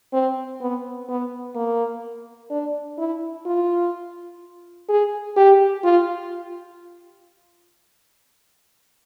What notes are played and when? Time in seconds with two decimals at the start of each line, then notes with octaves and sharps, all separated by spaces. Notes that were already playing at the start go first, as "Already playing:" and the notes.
0.13 C4
0.61 B3
1.09 B3
1.55 A#3
2.50 D4
2.98 E4
3.46 F4
4.89 G#4
5.37 G4
5.84 F4